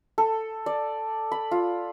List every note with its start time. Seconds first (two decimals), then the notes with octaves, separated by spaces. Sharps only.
0.18 A4
0.66 D5
1.32 B5
1.51 F4